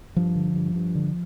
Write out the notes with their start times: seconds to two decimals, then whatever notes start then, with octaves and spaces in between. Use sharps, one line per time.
0.16 G2 F3
0.36 D3
0.55 G2
0.75 G2
0.95 D3